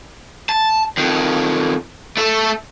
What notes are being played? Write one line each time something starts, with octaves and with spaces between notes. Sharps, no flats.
A5
F2 D#3
A3 A4